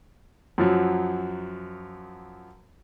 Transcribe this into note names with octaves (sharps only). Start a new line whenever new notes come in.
F#2 F3 F#3